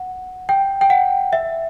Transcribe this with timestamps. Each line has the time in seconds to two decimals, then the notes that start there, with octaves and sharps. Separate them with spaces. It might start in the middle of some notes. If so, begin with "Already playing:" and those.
Already playing: F#5
0.49 G5
0.81 G5
0.90 F#5
1.33 E5